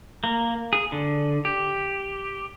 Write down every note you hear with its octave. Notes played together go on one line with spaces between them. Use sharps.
A#3
G#4
D3
G4